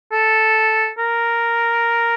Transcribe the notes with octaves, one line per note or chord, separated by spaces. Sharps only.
A4
A#4